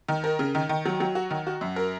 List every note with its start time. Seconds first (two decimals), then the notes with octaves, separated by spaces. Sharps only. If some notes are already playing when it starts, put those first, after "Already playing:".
0.08 D#3
0.24 A#4
0.39 C#3
0.55 D#3
0.69 D#3
0.86 F#3
1.00 F#3
1.15 F#4
1.31 D#3
1.47 F#4
1.61 F#2
1.76 A#4